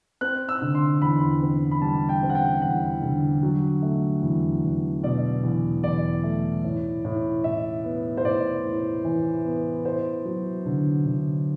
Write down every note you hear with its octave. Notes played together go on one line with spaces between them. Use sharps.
C4 F#6
E6
D3
C6
E2 B5
C4
B5
G3 A5
G5
C4
F#5
G5
E2 F#5
D3
F#3
A3
E2
E2
B2 D5
E2
E2 D5
A3
A2
A2
A2 E5
B3
C5
A2 D5
A2
E3
B3
E4 C5
F#3
D3
D3